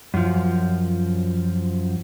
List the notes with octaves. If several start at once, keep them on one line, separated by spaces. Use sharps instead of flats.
F#2 F3